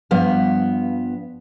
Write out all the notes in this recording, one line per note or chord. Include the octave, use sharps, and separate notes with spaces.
G2 F3 B3 F5